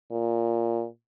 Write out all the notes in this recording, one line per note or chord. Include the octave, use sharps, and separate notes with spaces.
A#2